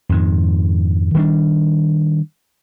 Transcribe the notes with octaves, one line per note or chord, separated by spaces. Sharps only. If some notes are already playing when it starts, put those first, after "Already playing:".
F2 G#2 D#3
D#3 G3 B3 D4